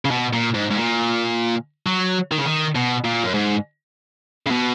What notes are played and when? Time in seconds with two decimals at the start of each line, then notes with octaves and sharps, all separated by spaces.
0.05 C#3
0.11 B2
0.33 A#2
0.54 G#2
0.70 G#2
0.77 A#2
1.87 F#3
2.31 D#3
2.38 C#3
2.45 D#3
2.75 B2
3.04 A#2
3.24 F#2
3.34 G#2
4.47 C#3
4.51 B2